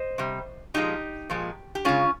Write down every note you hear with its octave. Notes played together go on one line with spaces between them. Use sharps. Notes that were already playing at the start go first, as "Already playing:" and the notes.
Already playing: C5 D#5
C3 G3
A#2 F3 G#3 D#4 G4
A#2 F3 G#3
G4
C#3 G#3 C#4 F4